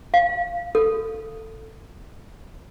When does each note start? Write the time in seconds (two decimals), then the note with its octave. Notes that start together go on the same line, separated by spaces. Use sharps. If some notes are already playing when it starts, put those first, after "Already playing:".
0.14 F5
0.75 A4